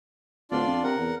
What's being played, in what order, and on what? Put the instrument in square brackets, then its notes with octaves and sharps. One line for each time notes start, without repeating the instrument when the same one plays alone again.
[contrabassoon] D1 [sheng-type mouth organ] D4 F4 D5
[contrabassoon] F2
[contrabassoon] C3 [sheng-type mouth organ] A#4 F#5
[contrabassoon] E2